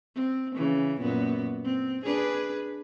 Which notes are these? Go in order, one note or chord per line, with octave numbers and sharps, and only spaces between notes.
C4
C#3 E3
F#2 A#2 B3
C4
D4 G#4 B4